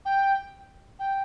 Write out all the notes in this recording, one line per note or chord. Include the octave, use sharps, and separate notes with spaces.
G5
G5